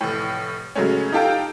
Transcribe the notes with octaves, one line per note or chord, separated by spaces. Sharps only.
F1 A2
C#3 F#3 G#3 A3 C#4
D#4 F4 G4 A4 F5 G5